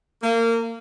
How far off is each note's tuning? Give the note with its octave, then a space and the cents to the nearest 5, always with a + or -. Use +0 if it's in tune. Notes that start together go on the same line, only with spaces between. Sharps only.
A#3 -25